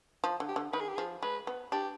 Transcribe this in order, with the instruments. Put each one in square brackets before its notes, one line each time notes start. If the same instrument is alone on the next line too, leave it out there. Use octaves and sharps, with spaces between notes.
[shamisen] F3
D3
[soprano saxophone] G4
[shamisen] D3
[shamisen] D#3 [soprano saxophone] B4
[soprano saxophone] G#4
G4
[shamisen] F3 [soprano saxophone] G#4
[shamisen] G#3 [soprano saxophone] B4
[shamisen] B3
[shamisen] D4 [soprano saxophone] G4